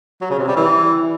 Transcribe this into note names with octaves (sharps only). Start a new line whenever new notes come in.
F#3
C#3
C3
G3
E3